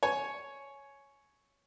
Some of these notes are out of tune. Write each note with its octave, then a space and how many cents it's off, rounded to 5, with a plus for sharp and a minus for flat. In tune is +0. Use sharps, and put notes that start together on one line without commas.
C#5 +0 G#5 +20